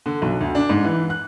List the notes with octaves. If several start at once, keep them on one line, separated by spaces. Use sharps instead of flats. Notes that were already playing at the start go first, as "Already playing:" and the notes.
D3
B1
D2
D4
G#2
E3
F#6